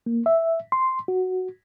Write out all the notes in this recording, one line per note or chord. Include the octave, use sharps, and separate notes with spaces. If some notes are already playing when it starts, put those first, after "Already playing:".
A#3
E5
C6
F#4